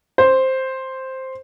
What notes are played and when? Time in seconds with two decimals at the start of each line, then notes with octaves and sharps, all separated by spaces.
0.18 C5